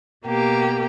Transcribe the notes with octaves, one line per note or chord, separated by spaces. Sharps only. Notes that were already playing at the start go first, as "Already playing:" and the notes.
B2 A#3 G4